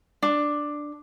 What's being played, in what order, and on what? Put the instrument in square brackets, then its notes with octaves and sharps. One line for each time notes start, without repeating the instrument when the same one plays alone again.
[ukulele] D4